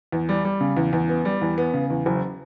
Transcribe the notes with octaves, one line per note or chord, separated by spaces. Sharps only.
E2
G3
G3
C#3
E2
E2
B3
G3
E2
B3
C#3
E2
F#1